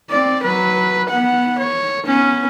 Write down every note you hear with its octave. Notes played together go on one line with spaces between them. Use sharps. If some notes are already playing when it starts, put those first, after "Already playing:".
C4 D5
F#3 B4
B3 F#5
C#5
B3 C#4